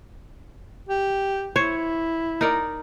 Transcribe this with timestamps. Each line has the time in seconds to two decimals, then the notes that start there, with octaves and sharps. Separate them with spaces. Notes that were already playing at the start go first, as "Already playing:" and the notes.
0.89 G4
1.56 E4 C5 C#5
2.41 D#4 A#4 D5